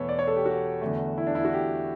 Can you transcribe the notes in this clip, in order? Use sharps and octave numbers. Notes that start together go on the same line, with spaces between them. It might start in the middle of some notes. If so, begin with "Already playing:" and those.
Already playing: E2 B2 A3 A4 B4 C#5
D5
C#5
A4
G4
F#4
E2 D3 A3
E4
D4
E4
F#4
G4